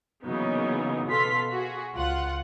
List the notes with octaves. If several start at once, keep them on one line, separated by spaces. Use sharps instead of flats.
C#3 E3 F#3 A#3 B3 D#4
B2 A4 B4 F5 C6 B6
F#4 G#4
C#2 F4 F#5